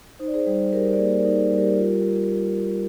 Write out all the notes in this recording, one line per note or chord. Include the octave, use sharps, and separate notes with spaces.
D#4 C5
D5
G#4 C5
G3 G#4
G3 G4 A#4
D5
A#3 G#4 C5
A#4 D5
D#4
G#4
G3
G4 A#4
F4